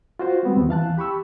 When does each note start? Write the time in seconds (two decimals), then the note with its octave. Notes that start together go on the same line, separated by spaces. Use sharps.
0.19 F4 F#4 C5
0.43 G3 G#3 B3 C4
0.57 D#2
0.69 E3 F5 A5 F#6
0.97 G4 B5 C#6 E6